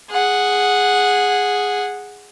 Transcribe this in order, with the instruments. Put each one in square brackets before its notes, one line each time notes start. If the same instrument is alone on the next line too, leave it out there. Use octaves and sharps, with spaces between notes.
[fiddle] G#4 F#5